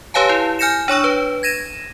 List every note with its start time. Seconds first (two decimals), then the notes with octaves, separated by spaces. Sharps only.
0.14 G4 B4 C#5 F5 G#5 A5
0.29 E4
0.59 G#5 F6 G6 A#6 C#7 E7
0.88 D4 C#5 C#6 E6
1.04 B4
1.43 G#6 A#6 D#7 E7